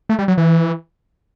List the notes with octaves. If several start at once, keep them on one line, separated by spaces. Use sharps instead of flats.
A3
G3
F#3
E3